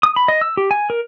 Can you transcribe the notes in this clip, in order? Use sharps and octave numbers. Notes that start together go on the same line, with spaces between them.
D#6
B5
D#5
E6
G4
G#5
A#4